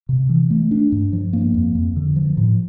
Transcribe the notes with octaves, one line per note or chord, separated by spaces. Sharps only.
C3
E3
A3
D4
G2
F3
A#3
F2
F2
D3
F3
A2